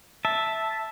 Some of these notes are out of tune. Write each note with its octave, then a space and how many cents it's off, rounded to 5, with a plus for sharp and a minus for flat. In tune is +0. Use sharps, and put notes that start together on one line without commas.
E5 +0 A5 +0